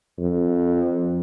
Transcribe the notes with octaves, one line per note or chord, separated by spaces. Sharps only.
F2